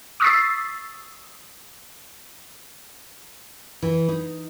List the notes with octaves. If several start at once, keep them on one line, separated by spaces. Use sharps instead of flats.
C#6 D#6 E6 A6 B6 C7
E3
D#4